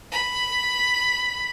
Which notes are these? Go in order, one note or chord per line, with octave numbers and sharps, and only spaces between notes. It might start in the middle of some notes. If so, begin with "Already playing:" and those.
B5